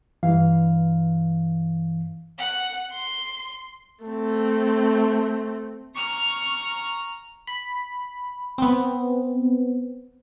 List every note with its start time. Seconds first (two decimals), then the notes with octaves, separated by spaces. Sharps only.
0.23 G2 E3 F5
2.39 F#5
2.91 C6
4.04 A3 C4
5.96 A#5 C#6 F6
7.47 B5
8.58 B3 C4